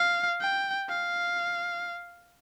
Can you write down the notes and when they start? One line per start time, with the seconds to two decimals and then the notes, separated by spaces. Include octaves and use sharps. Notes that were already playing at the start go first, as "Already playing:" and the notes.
Already playing: F5
0.41 G5
0.89 F5